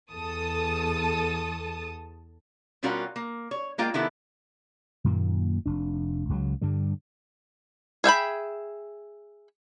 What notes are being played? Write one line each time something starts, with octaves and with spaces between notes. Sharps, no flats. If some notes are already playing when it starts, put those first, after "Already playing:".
E2 A4 A5 D#6
B2 G3 C#4 F4 F#4 A#4
A#3
C#5
G#3 A#3 F4 G5
C3 D#3 B3 E4 G4 A4
F#2 A#2 D#3 A#3
F1 D4
C#2 C#3 F3 F#3
G2 D3 G3
G#4 E5 G5 B5